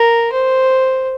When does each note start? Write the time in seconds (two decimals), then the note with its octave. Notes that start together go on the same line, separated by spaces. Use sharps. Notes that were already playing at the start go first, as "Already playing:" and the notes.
Already playing: A#4
0.33 C5